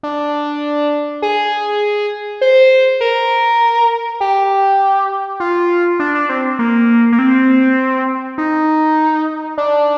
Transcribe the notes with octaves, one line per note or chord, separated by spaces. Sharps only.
D4
G#4
C5
A#4
G4
F4
D4
D4
C4
A#3
A#3
C4
D#4
D4